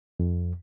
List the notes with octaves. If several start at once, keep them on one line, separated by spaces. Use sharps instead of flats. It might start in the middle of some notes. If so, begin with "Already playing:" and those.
F2